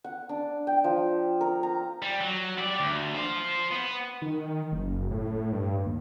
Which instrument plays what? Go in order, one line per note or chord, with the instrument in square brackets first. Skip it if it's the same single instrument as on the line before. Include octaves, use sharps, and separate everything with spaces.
[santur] F#5
D4
G5
F3
A#4
A#5
[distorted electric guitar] G3
F#3
G3 D5
D2
C5 F5
B3
[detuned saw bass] D#3
F#1
A2
G2
D#2